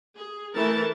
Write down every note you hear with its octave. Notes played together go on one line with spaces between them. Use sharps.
G#4
E3 A3 A#4 A5